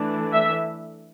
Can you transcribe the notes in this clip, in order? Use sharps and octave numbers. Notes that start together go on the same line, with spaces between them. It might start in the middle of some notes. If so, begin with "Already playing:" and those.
Already playing: E3 A3 D4
E5